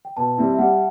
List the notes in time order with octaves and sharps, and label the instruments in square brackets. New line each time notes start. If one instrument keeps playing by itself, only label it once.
[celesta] G5
[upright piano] B2 [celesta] A5
[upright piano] G3 C4 E4
[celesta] E5
[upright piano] G3 [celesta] F#5